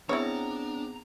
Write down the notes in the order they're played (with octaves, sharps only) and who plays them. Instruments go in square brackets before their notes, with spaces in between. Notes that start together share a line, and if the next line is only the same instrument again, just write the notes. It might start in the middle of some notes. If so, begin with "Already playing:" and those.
[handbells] B3 C4 G#4 [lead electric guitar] D4 [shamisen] E4 C#5 [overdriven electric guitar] A#5